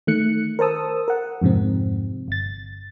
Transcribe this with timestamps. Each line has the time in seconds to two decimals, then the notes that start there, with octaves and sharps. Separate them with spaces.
0.07 D#3 A3 F#6 C#7
0.59 A#4 C5 A5 D#6 E6
1.08 A#4 F#5
1.42 F2 G#2 C3 C4
2.28 G1 A6